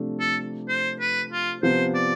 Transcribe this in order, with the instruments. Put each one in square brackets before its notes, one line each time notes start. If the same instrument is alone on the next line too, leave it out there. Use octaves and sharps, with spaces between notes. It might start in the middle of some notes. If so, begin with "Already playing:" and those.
Already playing: [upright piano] C3 F3 A3 D4
[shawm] A4
C5
B4
F4
[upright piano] C3 F3 B3 [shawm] C5
[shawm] D5